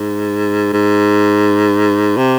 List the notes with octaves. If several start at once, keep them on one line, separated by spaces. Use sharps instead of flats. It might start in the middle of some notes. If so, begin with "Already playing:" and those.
Already playing: G#2
G#2
C3